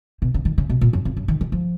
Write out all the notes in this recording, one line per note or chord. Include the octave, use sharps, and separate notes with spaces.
B2
C#3
D#3
C#3
B2
A#2
F#2
F2
F#2
D#3
D#3
F3